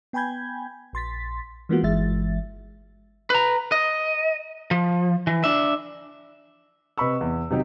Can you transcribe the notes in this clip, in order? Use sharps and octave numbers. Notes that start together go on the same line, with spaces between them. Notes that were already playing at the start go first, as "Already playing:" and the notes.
B3 G5 G#5 B5 G6 G#6
A#1 C6 A6 B6
E3 G#3 A#3 B3 F4 F#4
G1 E3 G#3 E5 A6
B4 A#5
D#5
F3
E3
D4 E5
C3 B4 D#5 B5 C#6 E6
E2
C3 D#3 F#3 D#4 F#4 G4